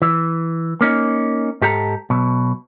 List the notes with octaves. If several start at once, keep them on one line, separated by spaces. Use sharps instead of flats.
E3
A#3 C#4 D#4
G#2 G4 A4 F#5 A#5
B1 B2